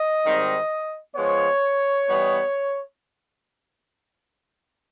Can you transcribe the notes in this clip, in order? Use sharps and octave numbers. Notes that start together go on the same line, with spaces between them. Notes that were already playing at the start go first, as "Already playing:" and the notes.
Already playing: D#5
G#2 D#3 G3 C4
F3 G#3 B3 C#5
E3 G3 B3 D#4